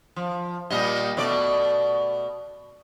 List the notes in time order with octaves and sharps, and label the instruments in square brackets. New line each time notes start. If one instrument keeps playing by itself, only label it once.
[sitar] F3
A#2 G3 D#5
B2 A3 D5